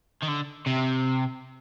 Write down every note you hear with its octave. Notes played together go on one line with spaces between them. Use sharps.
D#3
D3
C3